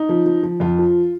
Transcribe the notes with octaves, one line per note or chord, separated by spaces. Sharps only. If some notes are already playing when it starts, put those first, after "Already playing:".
Already playing: D#4
F3
F3
F3
F2 F4
F3